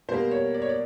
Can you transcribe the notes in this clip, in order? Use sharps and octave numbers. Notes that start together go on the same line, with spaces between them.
B2 G3 A#3 C5
C#5
D5
C#5
D5